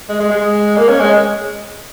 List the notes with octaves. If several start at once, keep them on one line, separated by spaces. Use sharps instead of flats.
G#3
G#3
G#3
A#3
C#4
G#3